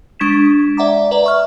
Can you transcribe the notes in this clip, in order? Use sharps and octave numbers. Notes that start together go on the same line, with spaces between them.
G#3 D4 C#6 G#6 B6 E7
D5 E5 F#5 A#5 D6
B4 D5 E5 A#5
E5 C#6 F6